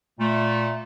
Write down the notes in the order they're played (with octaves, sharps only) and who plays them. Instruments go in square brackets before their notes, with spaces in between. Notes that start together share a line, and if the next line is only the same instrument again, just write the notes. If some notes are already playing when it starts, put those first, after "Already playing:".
[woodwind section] A#2 A3